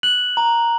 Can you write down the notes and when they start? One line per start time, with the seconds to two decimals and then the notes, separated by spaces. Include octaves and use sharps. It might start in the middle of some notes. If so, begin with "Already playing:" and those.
0.03 F#6 F#7
0.37 A#5